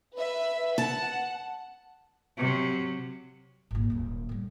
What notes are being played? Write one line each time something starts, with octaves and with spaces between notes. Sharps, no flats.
B4 E5
F#5 A5
C3 F#3
G#1 A#2
D#1 F#2
A2 G3